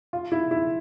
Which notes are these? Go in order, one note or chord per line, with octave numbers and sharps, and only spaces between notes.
F4
E4
E4